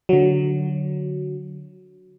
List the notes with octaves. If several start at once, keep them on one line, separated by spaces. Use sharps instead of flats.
D3 F#3